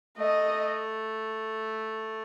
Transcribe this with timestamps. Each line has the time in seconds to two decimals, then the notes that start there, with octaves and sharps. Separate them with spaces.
0.18 A3 D#5